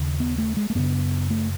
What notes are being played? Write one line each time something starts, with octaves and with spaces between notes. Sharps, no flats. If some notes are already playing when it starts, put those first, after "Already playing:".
Already playing: D#2 C#3
B3
A3
G#3
A3
F#2 C#3 B3
A3